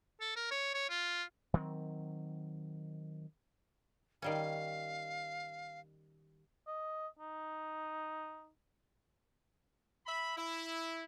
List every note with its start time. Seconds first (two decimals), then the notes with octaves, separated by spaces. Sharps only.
0.20 A4
0.36 A#4
0.51 C#5
0.74 C#5
0.90 F4
1.54 D#3 F#3 G#3 C4
4.22 D#3 G3 C#4 F5
6.67 D#5
7.19 D#4
10.06 E5 B5
10.37 E4